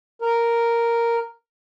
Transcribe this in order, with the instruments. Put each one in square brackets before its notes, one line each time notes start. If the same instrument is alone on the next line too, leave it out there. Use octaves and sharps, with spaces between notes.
[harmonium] A#4